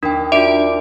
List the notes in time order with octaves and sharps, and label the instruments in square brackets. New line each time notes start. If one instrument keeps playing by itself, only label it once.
[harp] D#2 [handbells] D4 G5
[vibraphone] D4 [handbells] F4 F#4 D5 [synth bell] E5 D7